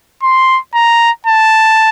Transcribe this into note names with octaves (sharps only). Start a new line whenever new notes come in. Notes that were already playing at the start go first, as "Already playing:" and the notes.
C6
A#5
A5